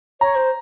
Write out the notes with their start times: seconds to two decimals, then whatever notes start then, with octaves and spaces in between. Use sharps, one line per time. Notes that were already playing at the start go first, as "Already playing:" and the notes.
0.21 C#5 A#5
0.36 C5